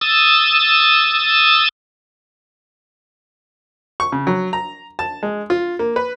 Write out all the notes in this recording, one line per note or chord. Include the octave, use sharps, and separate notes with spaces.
D#6 E6 A6
C#6
C#3
F#3
A#5
A5
G#3
F4
A#3
B4